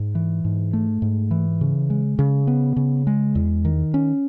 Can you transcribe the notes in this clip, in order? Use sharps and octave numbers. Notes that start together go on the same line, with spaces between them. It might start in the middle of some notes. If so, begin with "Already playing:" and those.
Already playing: G#2
E3
G#2
A3
G#2
E3
C#3
G#3
C#3
B3
C#3
G#3
E2
D#3
C#4